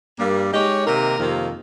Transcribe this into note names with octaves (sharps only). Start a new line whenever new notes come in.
G2 G3 A#3
G#3 D#4 G4 C#5
C3 D#3 A#3 D#4 A#4
F2 C3 D#3 A#3